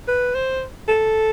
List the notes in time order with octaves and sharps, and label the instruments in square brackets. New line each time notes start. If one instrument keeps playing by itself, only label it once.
[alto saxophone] B4
C5
A4